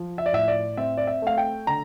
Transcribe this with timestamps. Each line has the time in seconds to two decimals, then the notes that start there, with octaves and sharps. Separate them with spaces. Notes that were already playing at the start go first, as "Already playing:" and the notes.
Already playing: F3
0.18 E5
0.26 D5
0.33 A2 E5
0.48 D5
0.77 C4 E5
0.97 D5
1.07 E5
1.22 A3 F5
1.38 G5
1.67 D3 A#5